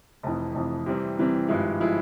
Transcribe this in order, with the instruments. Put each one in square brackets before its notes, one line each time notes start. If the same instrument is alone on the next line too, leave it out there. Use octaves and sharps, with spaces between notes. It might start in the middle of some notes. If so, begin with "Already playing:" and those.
[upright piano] F1 F2 E3
F1 F2 E3
C3 E3 G3 C4
C3 E3 G3 C4
G#1 G2 F3 G#3 E4
F3 G#3 E4